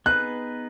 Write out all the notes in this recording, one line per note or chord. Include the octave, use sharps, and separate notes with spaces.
B3 D#4 G#4 B4 F#6